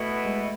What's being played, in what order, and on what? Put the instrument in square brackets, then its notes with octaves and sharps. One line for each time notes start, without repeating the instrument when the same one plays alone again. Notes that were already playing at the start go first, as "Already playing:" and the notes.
Already playing: [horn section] B2 B3 E4 [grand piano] A3
[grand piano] G#3